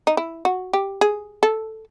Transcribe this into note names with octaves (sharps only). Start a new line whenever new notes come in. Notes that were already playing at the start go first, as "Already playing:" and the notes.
D#4
E4
F#4
G4
G#4
A4